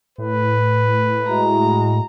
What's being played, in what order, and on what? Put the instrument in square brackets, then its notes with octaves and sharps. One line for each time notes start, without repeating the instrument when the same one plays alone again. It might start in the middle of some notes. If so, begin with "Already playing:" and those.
[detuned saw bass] A2 [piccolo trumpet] B4
[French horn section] G#3 E4 F#4 [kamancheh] A#5